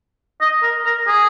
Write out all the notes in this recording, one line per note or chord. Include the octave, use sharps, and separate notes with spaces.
D#5
A#4
A#4
G#4